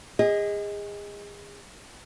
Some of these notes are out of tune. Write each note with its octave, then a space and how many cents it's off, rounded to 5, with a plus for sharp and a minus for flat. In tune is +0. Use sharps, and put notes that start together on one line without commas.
G#4 -30 D#5 +10